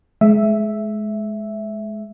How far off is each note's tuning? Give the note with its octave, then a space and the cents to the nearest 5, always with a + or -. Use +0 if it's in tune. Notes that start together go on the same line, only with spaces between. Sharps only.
G#3 +30 E5 +0